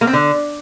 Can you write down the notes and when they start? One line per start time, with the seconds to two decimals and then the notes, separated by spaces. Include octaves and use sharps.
0.01 A#3
0.07 C4
0.13 D3